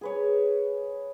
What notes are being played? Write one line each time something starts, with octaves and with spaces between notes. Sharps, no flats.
G#4 B4 C#5